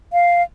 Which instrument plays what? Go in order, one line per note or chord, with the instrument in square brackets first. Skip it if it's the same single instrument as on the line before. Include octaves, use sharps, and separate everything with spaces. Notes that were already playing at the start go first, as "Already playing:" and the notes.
[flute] F5